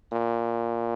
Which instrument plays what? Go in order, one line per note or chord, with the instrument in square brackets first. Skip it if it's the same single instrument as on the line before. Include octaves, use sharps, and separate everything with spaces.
[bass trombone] A#2